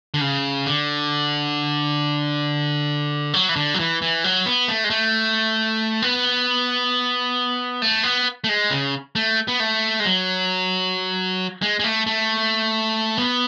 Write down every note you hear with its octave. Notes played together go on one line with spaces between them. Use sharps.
D3
C#3
D3
F#3
E3
D3
F#3
E3
E3
F#3
B3
A3
G#3
A3
B3
A3
B3
A3
G#3
C#3
A3
B3
A3
G#3
F#3
G#3
G#3
A3
A3
B3